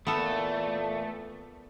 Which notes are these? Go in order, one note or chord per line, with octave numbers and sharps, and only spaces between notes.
A#2 E3 A3 B3 A4